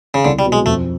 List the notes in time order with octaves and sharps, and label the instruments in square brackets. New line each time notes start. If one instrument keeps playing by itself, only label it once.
[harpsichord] C#3
[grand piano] C2 [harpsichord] D3
[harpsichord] G3
[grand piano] B2 F#3
[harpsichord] G#3
[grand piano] F2 [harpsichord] A3